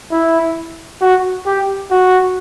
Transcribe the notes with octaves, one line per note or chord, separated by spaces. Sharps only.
E4
F#4
G4
F#4